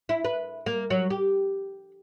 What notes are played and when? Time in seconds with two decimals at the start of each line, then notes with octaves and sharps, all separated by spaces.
0.09 E4
0.25 B4
0.66 A#3
0.90 F#3
1.10 G4